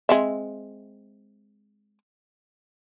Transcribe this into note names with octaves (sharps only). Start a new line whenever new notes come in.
G#3 C4 E5